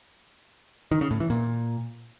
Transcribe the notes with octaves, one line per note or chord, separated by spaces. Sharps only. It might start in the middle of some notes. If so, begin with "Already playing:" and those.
D#3
C#3
A2
E3
A#2